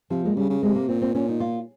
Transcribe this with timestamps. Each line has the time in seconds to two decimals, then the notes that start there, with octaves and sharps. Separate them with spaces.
0.10 C3 F3
0.23 A#2 G#3
0.36 C#3 G3
0.50 C#3
0.63 C3 G#3
0.75 A#3
0.88 A#2 C4
1.02 C4
1.15 A#2 C#4
1.29 D#4
1.40 F4